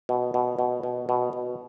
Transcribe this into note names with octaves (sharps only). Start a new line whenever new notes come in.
B2
B2
B2
B2
B2
B2